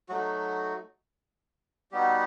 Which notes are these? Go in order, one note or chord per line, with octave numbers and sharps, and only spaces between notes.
F#3 A3 D#4 F#4
G3 B3 D#4 F#4 G4